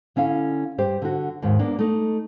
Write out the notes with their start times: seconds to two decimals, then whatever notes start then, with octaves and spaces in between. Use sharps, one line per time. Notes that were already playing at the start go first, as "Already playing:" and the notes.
0.16 D3 C#4 E4 F5
0.78 G2 G4 C5
1.02 D3 F#4
1.42 D#2 G#2 D#4
1.59 A#3 B3 D4
1.79 A3 D#4